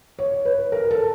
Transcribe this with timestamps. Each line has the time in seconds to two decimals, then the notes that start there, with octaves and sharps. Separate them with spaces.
0.19 C#5
0.45 B4
0.72 A#4
0.91 A4